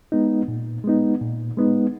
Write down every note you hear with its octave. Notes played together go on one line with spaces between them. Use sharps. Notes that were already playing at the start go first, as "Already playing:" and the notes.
G#3 B3 D#4
A#2
G#3 B3 D#4
A#2
G#3 B3 D#4